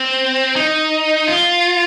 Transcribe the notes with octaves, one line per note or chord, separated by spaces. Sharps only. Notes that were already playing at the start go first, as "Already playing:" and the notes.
Already playing: C4
D#4
F4